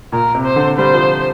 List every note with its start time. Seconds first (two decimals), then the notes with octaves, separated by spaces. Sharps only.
0.12 A#2 A#4
0.35 C3
0.45 C5
0.56 D3
0.77 G3 C5
0.94 F3